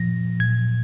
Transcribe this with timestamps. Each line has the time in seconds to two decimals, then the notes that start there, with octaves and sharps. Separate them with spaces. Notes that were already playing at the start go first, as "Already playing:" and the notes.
Already playing: A#2 F3 A#6
0.40 A#2 F#3 G#6